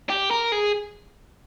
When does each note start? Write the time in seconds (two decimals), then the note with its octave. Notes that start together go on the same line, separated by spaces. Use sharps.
0.10 G4
0.31 A#4
0.52 G#4